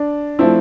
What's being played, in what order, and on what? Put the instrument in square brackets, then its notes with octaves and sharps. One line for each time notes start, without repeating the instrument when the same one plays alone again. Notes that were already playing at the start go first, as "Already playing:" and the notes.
Already playing: [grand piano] D4
[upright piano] F3 A3 C4 E4